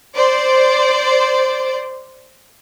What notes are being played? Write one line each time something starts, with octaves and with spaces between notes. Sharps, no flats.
C5 D5